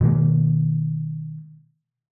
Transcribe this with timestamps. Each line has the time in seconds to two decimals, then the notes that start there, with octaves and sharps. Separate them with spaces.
0.01 B2 D#3 G#3 A#3